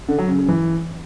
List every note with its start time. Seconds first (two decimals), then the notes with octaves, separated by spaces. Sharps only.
0.08 D3
0.18 F#3
0.28 C#3
0.38 C#3
0.49 E3